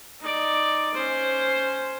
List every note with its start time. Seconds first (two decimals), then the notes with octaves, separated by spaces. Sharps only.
0.20 D#4 D5
0.94 C#4 C5